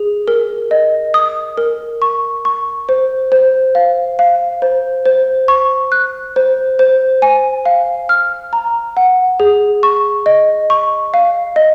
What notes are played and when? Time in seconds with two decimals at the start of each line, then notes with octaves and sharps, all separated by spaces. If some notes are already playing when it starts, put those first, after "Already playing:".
Already playing: G#4
0.28 A#4
0.71 D#5
1.14 D#6
1.58 A#4
2.02 C#6
2.45 C#6
2.89 C5
3.32 C5
3.75 F5
4.19 F5
4.62 C5
5.06 C5
5.48 C#6
5.92 F#6
6.36 C5
6.79 C5
7.22 G#5
7.66 F5
8.09 F6
8.53 A#5
8.97 F#5
9.40 G#4
9.83 C#6
10.26 D#5
10.70 C#6
11.14 F5
11.56 D#5